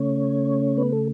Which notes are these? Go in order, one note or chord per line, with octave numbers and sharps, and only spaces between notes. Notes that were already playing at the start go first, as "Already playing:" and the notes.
Already playing: C#3 A3 C#4 C#5
B3 B4
A4